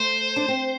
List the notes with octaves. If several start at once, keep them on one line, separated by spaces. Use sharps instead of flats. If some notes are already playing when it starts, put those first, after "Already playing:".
Already playing: A3 C5
D4
C4